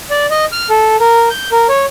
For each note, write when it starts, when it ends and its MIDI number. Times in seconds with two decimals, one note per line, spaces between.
0.10 0.26 74
0.30 0.45 75
0.52 0.69 89
0.70 0.96 69
1.00 1.29 70
1.30 1.50 91
1.52 1.67 70
1.69 1.86 73